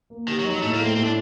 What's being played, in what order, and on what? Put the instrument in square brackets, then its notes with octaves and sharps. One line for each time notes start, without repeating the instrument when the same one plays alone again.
[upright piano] A#3
[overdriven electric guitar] D#3 [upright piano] G4
[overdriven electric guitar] F#3
[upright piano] D#4
[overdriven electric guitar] F#3
[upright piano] A2 [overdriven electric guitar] A3
[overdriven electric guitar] A#3
[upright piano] A3
[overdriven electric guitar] C4
[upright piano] A2 [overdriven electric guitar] C4
[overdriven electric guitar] D4